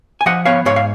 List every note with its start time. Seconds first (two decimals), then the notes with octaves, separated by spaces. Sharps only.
0.21 G#5
0.26 F3 D#5 F#5
0.45 B3 C#5 F5
0.66 G#2 C#5 F5
0.76 F5